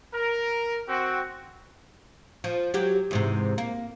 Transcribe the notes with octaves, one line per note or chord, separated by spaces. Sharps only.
A#4
C4 F#4
F3
F#3 G4
E2 G#2 C3
A#3